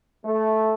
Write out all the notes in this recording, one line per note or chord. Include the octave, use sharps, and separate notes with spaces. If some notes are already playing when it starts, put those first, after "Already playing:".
A3